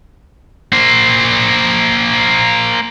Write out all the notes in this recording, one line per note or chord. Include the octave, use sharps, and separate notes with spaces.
A#3 C5